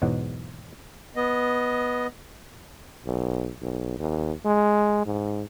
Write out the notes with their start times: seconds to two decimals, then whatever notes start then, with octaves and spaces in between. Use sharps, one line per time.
0.02 E2 G#2 B2 F#3 F#5
1.16 B3 D#5
3.06 B1
3.62 B1
3.99 D#2
4.45 G#3
5.06 G#2